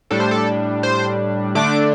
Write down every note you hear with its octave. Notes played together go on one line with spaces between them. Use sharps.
A2 G3 D4 A4
C5
A4
C5
D3 A3 D4 D6